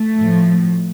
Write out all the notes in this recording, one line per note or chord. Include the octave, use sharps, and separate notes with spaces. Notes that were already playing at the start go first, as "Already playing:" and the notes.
Already playing: A3
A2 F3